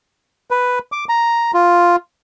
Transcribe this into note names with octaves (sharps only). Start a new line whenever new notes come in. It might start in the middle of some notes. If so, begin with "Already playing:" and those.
B4
D6
A#5
F4